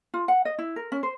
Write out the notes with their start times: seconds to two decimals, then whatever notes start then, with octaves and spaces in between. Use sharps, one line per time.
0.14 F4
0.28 F#5
0.45 D#5
0.58 E4
0.76 A#4
0.92 C#4
1.03 C5